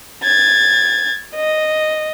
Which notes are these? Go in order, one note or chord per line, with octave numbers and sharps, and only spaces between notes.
G#6 A6
D#5